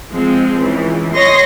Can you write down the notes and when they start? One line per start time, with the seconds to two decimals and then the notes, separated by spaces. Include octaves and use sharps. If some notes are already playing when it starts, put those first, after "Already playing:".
0.11 F3 G#3 C4
0.61 C#2 E3
1.13 C#5 D#5 C6 A#6